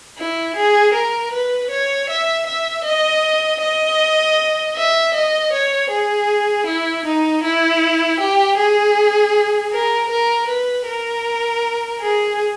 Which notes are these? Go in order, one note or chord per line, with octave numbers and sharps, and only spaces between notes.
E4
G#4
A#4
B4
C#5
E5
E5
D#5
D#5
E5
D#5
C#5
G#4
E4
D#4
E4
G4
G#4
A#4
A#4
B4
A#4
G#4